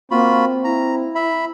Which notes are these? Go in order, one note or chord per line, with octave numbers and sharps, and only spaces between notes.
A#3 C4 F4 F#4 B5
E4 A#5
E5 B5